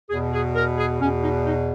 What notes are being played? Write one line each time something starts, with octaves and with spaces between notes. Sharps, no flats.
E2 B2 G#4
G#4
A#4
G#4
E2 B2 C#4
D#4
D#4